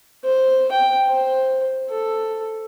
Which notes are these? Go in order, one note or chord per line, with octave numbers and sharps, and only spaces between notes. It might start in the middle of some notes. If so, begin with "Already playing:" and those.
C5
G5
C5
A4